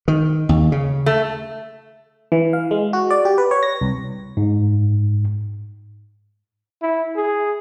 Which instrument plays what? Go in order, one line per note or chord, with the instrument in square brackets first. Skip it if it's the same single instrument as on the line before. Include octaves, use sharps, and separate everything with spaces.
[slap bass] D#3
D#2
C#3
[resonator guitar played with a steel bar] A3
[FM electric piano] E3
F5
G#3
F#4
D5
G4
B4
C#5
A#6
C2
[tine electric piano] G#2
[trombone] E4
G#4